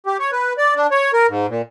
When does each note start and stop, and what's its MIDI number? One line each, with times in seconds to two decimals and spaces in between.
0.06 0.17 67
0.19 0.31 73
0.32 0.53 71
0.58 0.74 74
0.75 0.87 62
0.91 1.11 73
1.13 1.27 70
1.29 1.47 44
1.49 1.62 46